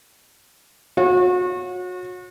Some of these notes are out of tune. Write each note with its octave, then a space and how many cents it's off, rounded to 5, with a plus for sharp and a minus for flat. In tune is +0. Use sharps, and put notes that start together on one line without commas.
F#4 -35 C#5 -20